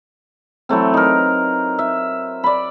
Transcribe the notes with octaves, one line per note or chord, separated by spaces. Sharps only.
E3 F#3 A3 C4
D#4 A#4
E5
D5 B5